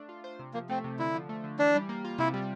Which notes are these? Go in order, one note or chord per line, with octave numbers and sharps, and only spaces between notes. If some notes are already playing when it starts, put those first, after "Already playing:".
Already playing: A3 D4
F4
C5
C3
F3 A#3
A3 C4
C3
D3 E4
F3
A3
D3
E3 D4
G3
A#3
F4
C3 E4
G3